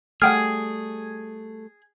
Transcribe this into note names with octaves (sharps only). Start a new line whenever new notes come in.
G3 A3 G#4 F#5 G5 F6